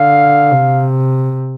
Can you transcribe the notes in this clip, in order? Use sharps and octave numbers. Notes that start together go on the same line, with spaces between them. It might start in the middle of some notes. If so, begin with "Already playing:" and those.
Already playing: D3 F5
C3